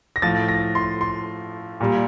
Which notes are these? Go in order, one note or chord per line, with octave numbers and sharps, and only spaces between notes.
A#6
A2 F3 A6
A#6
C6
C6
A#2 G3